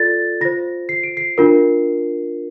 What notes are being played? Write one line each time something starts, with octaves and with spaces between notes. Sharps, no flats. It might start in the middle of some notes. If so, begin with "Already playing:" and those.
Already playing: F4 A4 D5 A6
F4 C5 A#6
C7
D7
C7
D4 F4 A#4